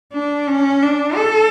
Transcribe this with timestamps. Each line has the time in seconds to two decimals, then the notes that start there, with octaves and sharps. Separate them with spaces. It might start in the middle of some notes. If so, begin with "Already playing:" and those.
0.13 D4
0.48 C#4
0.83 D4
1.16 A4